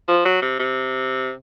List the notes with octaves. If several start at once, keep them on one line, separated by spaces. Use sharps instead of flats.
F3
F#3
C3
C3